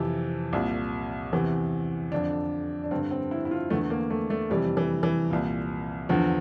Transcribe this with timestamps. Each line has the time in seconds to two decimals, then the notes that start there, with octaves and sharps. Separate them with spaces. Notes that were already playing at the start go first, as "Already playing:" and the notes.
Already playing: F2 C3 E3
0.53 C2 A#2
1.32 E2 C3 E3
2.11 F2 D3 D4
2.84 D4
2.91 G2 D3 C4
3.11 C4
3.31 E4
3.45 E4
3.51 F4
3.70 E2 D3 A3
3.90 A#3
4.10 A3
4.30 A3
4.50 F2 C3 E3 G3
4.77 E3
5.03 E3
5.30 C2 A#2
6.09 E2 D3 F3